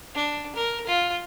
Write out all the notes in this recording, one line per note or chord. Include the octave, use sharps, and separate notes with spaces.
D4
A#4
F4